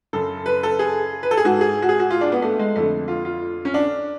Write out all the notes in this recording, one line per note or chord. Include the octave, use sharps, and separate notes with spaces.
F#2 C#3 A4
B4
A4
G#4
B4
A4
G#4
G#2 F#4
G#4
F#4
G#4
F#4
F4
D4
B3
A3
G#3
F2 D3 A3
F4
F4
C#4
D4